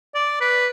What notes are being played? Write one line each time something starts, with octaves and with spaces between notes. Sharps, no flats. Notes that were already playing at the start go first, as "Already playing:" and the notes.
D5
B4